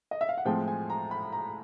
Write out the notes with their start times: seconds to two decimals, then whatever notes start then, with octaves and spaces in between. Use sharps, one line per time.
0.11 D#5
0.21 E5
0.29 F5
0.37 F#5
0.45 A2 F3 G#3 C4 G5
0.68 G#5
0.90 A#5
1.11 B5
1.33 A#5